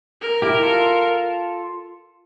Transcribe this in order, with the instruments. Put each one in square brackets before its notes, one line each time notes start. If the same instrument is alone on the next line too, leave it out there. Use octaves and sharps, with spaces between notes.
[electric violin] A#4
[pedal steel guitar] E4 G4
F4 A4